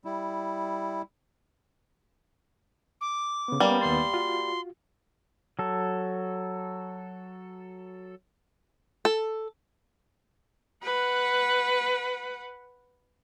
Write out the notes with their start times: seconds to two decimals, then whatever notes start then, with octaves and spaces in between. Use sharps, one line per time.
0.05 G3 E4
3.01 D6
3.48 C#3 B3
3.60 G3 A#3 B3 C#4
3.81 D#2 B3 C6 A6
4.13 F4 F#4
5.59 F#3 A4
9.05 A4
10.83 B4 F#5